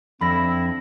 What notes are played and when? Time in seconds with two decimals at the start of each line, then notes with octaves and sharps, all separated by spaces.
0.21 F2 D3 C4 E4 B5 A#6